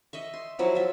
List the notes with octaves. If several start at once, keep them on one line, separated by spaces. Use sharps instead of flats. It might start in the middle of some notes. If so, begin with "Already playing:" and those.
D#5 E5 C#6
C6
F3 F#3 E4
F4 E5